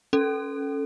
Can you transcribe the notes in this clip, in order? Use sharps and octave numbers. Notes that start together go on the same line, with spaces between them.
C#4 A4